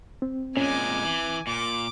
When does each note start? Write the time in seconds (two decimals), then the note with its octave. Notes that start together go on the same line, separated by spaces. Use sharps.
0.22 C4
0.57 A#2 G#3 C#4 G#5 D6
1.04 E3
1.47 A#2 D6